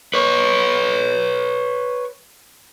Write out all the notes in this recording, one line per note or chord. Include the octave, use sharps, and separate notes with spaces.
B4 C#5